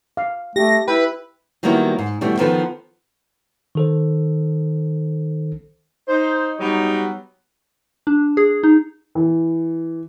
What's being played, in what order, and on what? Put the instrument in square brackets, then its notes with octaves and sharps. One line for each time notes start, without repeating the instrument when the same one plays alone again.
[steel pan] F5
[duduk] A3 [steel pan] G4 [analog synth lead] A#6
[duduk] E4 [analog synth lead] B4 [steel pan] G5
[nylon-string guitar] D#3 F#3 G3 A#3 B3 E4
G#2
B2 E3 G3 A3
D#3 F3 B3 F4 A4 B4
[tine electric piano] D#3 A4 C5
[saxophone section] D#4 C5
F#3 G3 B3 D#4 G4 C#5
[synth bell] D4
G#4
D#4
[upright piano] E3